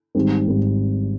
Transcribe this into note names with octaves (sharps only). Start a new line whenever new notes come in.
G#1 G#2 G3 C4
G#1 G#2 G3 C4